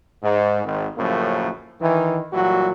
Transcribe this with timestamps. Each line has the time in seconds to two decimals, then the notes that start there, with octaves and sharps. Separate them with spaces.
0.23 G#2
0.64 G#1
0.97 F#2 A2 C#3 F3 A#3
1.81 D#3 E3
2.33 A#2 E3 F#3 G3 F#4